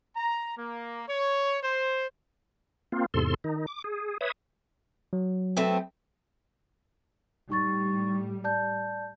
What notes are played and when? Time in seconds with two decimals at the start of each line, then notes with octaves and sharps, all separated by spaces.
0.16 A#5
0.57 A#3
1.07 C#5
1.63 C5
2.92 A#3 C4 F4
3.14 E2 G#2 C3 A4 C6
3.44 D#3 D#4
3.67 D6
3.84 G#4
4.21 B4 C#5 E5 D#6
5.13 F#3
5.57 A3 B3 C4
7.50 A2 G3 D#4 C#6 A6
8.44 D5 A5 G6